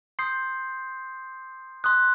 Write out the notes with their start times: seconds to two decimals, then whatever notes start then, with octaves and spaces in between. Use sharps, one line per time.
0.19 C6 D#6 G6 C7
1.84 C6 D#6 F#6